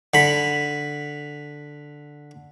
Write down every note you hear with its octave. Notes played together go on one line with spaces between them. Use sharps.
D3 B5